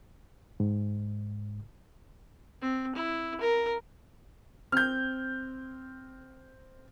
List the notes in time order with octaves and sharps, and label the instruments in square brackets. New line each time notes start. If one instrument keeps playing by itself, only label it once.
[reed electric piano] G#2
[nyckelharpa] C4
E4
A#4
[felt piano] C4 [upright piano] F6 G6